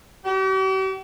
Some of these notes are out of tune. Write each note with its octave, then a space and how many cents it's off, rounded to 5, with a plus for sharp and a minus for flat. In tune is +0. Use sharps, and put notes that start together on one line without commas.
G4 -45